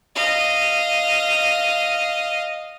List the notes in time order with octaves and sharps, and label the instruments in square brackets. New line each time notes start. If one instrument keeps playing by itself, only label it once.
[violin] D#5 F5